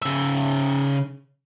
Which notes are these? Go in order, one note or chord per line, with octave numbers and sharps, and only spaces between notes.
C#3 E5